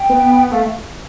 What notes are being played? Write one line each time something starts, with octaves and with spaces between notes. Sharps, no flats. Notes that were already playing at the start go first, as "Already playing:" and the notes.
Already playing: G5
B3
A3 F5